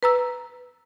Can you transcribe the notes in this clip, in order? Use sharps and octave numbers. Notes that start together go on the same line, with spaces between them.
B4 A#5 E6